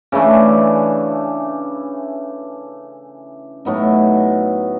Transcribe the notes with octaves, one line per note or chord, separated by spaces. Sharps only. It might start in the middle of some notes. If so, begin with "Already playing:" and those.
C#3 E3 A3 D4
A2 F#3 B3 D#4